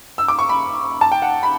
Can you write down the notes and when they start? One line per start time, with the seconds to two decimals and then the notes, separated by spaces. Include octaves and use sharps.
0.18 E6
0.28 D6
0.39 C#6
0.49 B5
1.01 A5
1.12 G5
1.22 F#5
1.43 B5